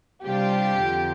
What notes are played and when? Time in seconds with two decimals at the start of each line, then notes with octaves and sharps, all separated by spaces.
0.24 C3 G3 D4 F4 G4
0.80 F2 D3 F3